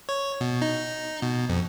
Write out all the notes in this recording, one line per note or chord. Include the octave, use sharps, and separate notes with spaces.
C#5
B2
D#4
B2
F2